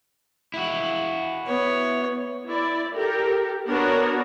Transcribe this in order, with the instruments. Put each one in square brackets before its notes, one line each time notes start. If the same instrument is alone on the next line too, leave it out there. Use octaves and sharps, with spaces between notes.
[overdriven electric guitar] E4 F#4
[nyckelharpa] B3 C#5
[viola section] E4 D5
G4 A4 A#4
B3 D4 F#4 A#4 C#5